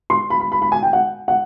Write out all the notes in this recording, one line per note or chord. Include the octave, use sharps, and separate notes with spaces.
C6
B5
B5
B5
B5
G#5
G5
F#5
F#5